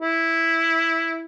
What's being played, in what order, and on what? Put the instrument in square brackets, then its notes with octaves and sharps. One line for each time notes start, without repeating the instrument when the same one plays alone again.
[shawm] E4